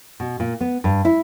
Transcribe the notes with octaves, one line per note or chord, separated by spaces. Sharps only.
B2
A#2
B3
G2
E4